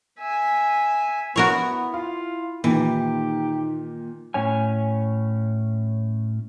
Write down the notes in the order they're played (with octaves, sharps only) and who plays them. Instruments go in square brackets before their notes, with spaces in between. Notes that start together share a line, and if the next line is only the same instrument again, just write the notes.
[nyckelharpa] E5 G#5
[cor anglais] B3 [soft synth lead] E4 [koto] F#4 A#4 C#5
[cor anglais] F4 [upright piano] F5
[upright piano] A#2 D#3 [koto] E3 [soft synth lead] D#4 [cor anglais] G4
[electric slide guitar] A2 C#4 C#5 G#5